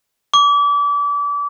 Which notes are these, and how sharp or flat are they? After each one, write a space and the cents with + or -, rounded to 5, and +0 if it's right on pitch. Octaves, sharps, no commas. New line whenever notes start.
D6 -30